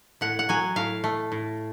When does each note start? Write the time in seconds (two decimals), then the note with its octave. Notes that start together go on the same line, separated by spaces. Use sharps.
0.21 A2 F#5
0.39 F#5
0.49 F#3 G#5
0.76 A2 F5
1.04 A3
1.32 A2